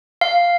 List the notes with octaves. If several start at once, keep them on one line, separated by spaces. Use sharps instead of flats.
F5